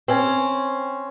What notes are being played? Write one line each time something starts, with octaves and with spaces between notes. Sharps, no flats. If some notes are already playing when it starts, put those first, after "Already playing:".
C4 C#4